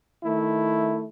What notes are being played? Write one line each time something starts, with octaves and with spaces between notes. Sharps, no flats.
D#3 A3 E4